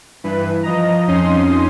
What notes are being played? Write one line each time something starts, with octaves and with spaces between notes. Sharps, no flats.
G2 E3 B4
F3 D#5 A#5
F2 C#4 D#4 C6 D#6